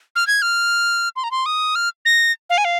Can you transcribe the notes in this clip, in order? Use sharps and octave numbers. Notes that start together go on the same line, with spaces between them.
F6
G#6
F6
C6
A#5
C6
D#6
F6
A#6
F5
G#5
F5